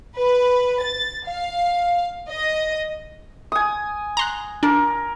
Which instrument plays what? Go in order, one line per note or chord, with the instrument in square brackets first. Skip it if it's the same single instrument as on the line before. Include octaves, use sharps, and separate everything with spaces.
[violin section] B4
A6
F5
D#5
[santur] G#5 D#6
[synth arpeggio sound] A#5 C6 F#6
[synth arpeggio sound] D4 [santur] A#4